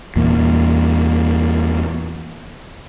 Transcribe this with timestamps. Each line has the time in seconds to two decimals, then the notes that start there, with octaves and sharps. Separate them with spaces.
0.16 E2 A#2